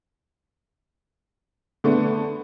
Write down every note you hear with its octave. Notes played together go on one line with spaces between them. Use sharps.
D3 A3 B3